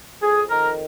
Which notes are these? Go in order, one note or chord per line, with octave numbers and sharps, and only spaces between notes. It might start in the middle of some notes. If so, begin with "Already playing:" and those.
F2 G#4
D#3 A#4